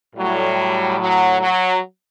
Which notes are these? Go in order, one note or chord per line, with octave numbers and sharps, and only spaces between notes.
A2 F#3 G3
F#3
F#3